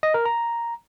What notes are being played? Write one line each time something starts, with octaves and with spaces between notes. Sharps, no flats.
D#5
A#4
A#5